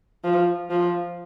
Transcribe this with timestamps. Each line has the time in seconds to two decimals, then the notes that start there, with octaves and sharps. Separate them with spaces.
0.24 F3
0.70 F3